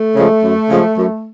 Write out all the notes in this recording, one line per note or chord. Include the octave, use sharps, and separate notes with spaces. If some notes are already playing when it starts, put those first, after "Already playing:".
Already playing: A3
C#3 F3 G#3
F#2
C#3 F3 G#3
F#2